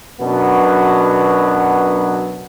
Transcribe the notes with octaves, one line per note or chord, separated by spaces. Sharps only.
F#2 B2 F#3 B3 D4